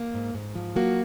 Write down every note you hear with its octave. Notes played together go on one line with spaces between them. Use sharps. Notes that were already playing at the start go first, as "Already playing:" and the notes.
Already playing: A#3
G#2
G#2
F3
F#3 A#3 F#4